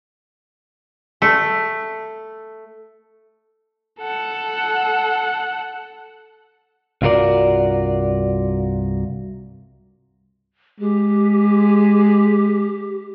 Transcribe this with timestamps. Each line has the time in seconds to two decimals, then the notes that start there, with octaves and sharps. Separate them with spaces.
1.22 A3
4.01 A4 F#5
7.02 C2 G2 F4 F#4 A#4 D5
10.80 G#3 G4